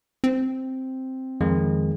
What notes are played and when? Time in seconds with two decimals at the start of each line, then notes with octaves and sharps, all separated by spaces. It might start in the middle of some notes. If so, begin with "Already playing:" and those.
0.24 C4
1.41 F2 D#3 G#3